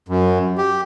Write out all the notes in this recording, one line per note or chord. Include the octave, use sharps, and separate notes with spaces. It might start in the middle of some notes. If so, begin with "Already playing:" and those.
F#2
G4